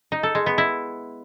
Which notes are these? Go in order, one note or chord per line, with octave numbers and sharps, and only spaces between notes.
D#4
A4
G#3
B3
E4